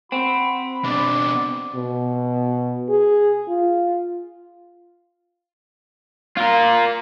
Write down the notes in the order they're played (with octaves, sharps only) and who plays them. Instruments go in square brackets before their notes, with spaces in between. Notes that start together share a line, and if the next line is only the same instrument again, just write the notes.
[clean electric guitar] C4 [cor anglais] F#4 [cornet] B5
[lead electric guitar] B2 D4 [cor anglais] D5
[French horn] B2
G#4
F4
[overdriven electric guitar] F4 A#4